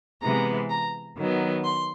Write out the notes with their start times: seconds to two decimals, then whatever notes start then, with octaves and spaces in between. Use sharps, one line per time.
0.22 C3 E3 G#3 B3 A#5
0.70 A#5
1.17 D#3 F#3 B3
1.64 C6